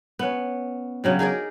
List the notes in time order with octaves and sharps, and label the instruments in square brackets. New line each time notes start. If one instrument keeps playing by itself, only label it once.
[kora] B3 C#4
C#3 F#3 G3
D#4 G#4 A#4 D5